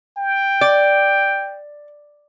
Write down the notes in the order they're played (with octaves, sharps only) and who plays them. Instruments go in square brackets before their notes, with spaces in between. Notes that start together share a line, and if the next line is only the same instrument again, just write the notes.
[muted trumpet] G5
[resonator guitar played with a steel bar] D5